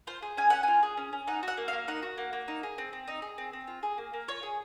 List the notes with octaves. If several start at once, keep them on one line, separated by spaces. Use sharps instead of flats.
F4 C5
G#4
C#4 G#5
C#4 F#5
F4 G#5
G#4
C#4
C#4
D#4 F#5
F#4 F#5
A#3
F5
A#3
D#4 F#5
F#4
A#3
A#3
D#4
G#4
C4
C4
D#4
G#4
C4
C4
F4
G#4
A#3
A#3
F4 C#5
G#4